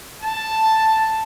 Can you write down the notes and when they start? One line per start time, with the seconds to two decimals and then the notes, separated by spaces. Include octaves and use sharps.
0.22 A5